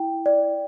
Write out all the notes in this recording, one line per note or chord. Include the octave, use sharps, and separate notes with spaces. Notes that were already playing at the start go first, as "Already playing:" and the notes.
Already playing: E4 G5
D5